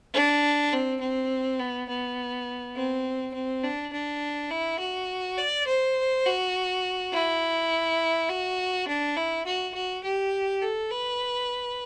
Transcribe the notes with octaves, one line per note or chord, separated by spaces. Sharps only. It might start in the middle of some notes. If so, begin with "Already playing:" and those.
D4
C4
C4
B3
B3
C4
C4
D4
D4
E4
F#4
D5
C5
F#4
E4
F#4
D4
E4
F#4
F#4
G4
A4
B4